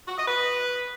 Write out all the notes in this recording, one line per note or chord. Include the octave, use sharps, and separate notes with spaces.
F#4
D#5
B4